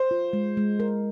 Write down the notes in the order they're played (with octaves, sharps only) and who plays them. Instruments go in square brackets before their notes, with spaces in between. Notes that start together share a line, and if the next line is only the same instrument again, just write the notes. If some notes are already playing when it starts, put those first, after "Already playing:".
Already playing: [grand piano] C5
[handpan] F4
G#3
G#3
A#4